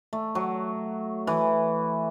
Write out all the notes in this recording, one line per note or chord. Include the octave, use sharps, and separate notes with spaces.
A3
F#3
E3